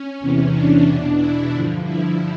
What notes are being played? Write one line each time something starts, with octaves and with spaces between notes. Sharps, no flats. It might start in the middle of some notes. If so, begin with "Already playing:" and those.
Already playing: C#4
E2 C3 E3
D4
E2 B2
E4
G2 D3 F3
E4